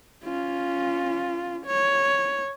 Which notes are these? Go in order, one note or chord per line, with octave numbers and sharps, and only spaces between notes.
C#4 F4
C#5